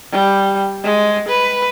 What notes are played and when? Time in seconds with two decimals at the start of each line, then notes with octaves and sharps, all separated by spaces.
0.12 G3
0.84 G#3
1.29 B4